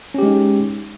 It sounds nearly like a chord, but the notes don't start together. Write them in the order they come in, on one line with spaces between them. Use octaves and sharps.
C#4 G4 G#3 D#4